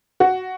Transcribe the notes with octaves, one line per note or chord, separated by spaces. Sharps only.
F#4